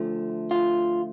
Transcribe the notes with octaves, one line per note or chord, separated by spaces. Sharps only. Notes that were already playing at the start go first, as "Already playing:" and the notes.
Already playing: D3 F3 A3
F4